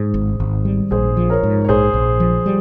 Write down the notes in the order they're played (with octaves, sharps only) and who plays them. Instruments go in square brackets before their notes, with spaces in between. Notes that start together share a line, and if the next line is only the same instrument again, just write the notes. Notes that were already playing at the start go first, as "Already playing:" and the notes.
Already playing: [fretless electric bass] G#2 [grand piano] G#4 C5
[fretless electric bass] G#1
G#1
G3
[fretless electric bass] A#1 [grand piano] G#4 C5
[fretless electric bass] F3
[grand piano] A#4 C#5
[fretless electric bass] G#2
[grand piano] C#5
[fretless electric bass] A#1 [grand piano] G#4 C5
[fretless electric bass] A#1
F3
G3